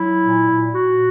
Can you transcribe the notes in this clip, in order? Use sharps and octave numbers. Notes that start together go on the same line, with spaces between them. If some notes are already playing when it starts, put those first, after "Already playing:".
Already playing: F#3 E4
A#2
A#2
A#2 F#4